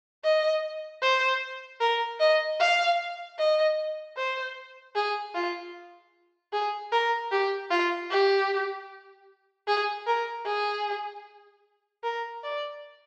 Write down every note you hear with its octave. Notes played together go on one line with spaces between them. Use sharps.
D#5
C5
A#4
D#5
F5
D#5
C5
G#4
F4
G#4
A#4
G4
F4
G4
G#4
A#4
G#4
A#4
D5